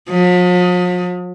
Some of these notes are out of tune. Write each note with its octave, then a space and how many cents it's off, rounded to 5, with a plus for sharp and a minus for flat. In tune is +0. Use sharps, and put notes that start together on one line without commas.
F3 +45